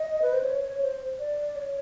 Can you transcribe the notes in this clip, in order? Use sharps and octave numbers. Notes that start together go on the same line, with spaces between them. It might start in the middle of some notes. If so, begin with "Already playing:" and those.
Already playing: D#5
B4
C5
C#5
C#5
C5
D5
C#5